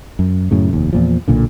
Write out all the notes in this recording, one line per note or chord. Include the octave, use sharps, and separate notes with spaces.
F#2
F#2 A2 C#3
F1 D#2
E2 A#2 F3
B1 A#2 D3